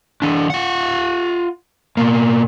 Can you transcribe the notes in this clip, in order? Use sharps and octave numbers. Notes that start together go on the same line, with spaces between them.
E3 D4
F4 F#5
B2 A#3